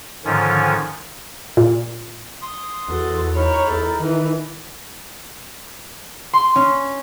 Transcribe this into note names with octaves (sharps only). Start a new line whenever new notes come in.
G#2 D3 D#3 F3 C#4
A#2
C6 D#6
E2 F#4 A4
D#4 A#4 C#5 B5
E2 A4
D#3 E3
C6
C#4